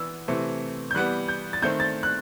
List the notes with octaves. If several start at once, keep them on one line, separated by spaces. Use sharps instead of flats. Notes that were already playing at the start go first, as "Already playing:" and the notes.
Already playing: E3 B3 E6
C3 E3 A3 C4
G6
E3 G3 B3 F#6
G6
A6
D#3 A3 C4 G6
A6
F#6